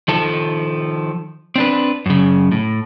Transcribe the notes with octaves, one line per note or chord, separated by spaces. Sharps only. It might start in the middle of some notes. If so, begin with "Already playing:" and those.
D#3 F3 A4
C4 D4 B4
F#2 C#3
A2